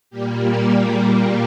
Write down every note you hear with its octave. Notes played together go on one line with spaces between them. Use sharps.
A#2 G3 A#3 G4
A#4
G#4